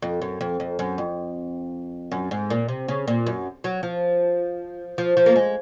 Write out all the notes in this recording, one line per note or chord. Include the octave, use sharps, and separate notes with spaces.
F2
F#2
F2
F2
F#2
F2
F#2
G#2
A#2
C3
C#3
A#2
F#2
F#3
F3
F3
F3
A#3
G#3